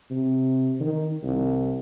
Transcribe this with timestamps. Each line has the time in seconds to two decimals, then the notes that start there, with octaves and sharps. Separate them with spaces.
0.10 C3
0.80 D#3
1.23 C2